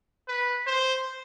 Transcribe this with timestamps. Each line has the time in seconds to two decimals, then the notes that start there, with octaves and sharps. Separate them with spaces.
0.28 B4
0.67 C5